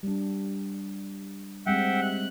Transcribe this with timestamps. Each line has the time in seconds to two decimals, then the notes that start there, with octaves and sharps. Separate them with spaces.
0.03 G3 D4
1.66 G3 G#3 C4 E5 F#5 G5
2.02 F#6